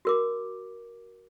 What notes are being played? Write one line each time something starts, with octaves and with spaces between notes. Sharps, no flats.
F#4 A#4 D6